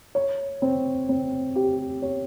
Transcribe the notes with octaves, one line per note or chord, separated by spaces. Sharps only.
C#5
C4
C4
G4
C#5